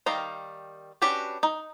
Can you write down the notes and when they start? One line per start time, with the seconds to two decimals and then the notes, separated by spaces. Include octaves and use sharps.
0.06 D#3 G3 F5 G5 A#5
1.02 C#4 D4 F#4 G4 B4
1.43 D#4